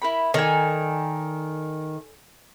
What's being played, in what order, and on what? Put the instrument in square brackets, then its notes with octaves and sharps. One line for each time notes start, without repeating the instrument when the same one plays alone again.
[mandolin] E4 A#4 B5
[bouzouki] D#3 [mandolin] A4 D5 G#5